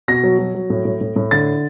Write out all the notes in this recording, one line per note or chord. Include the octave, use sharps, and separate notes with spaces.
B2 A#6
F#3
F#3
F#3
A2
A2
A2
A2
D3 A6